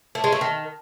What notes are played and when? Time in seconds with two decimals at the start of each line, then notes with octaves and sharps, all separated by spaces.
0.15 A3
0.24 G#3
0.32 A3
0.41 D#3